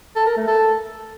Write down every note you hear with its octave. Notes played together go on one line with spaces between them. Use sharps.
A4
A#4
A3
A4